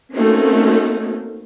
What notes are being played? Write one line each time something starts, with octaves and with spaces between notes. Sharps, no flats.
A3 A#3 C4 C#4 D#4 F#4